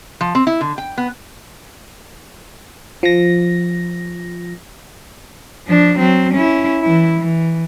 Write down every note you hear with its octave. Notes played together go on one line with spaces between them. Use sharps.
F3
C4
E4
D3
G5
B3
F3 A#6
F3 D4
F#3 C4
C#4 E4
E3 E4
E3